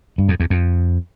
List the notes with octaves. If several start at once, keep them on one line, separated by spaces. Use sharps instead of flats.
G2
F2
E2
F2